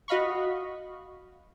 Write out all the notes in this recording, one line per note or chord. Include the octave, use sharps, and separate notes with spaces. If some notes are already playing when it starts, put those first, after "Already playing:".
F#4 D#5 F5 B5 C#6